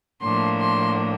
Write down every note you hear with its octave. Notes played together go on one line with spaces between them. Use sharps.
A2 F3 A#3 D4 C6
C6